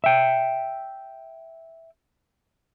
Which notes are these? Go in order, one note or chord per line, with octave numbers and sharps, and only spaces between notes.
E5 G5